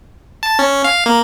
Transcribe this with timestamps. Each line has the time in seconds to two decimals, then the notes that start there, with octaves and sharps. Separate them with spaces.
0.43 A5
0.59 C#4
0.84 F5
1.06 A#3